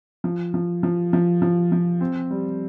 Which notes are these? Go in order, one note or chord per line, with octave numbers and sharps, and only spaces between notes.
F3
F3
F3
F3
F3
F3
C4
G3